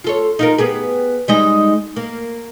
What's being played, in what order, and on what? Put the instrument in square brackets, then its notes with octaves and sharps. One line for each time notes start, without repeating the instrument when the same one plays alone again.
[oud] F4 A4 C#5
D#4 F4 A#4
B3 G4 G#4
G3 G#3 D#4
A#3